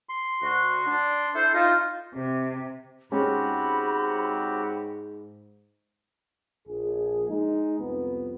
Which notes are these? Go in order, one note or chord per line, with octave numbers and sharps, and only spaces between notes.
C6
D2 F#4
D4
E4 A4 C5
D#4 F4
C3
G#2 G#3 C4 C#4 F#4 G4 B5
A#1 G#4
G#3 D#4
C2 F2 B3